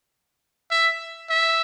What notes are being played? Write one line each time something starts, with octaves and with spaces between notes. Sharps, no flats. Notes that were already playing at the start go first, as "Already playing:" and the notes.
E5
E5